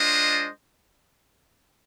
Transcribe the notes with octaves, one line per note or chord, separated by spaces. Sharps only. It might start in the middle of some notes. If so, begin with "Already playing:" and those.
Already playing: G#3 D4 F4 C5 D#5